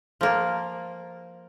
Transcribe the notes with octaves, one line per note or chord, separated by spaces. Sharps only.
F3 A#3